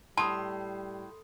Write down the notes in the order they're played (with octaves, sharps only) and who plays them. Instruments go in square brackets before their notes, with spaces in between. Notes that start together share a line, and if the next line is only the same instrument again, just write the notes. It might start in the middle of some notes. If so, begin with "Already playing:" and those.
[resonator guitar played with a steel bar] A2 [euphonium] G3 [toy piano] A5 [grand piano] C6 D#6